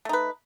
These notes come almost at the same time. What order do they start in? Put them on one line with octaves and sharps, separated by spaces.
A3 D#4 B4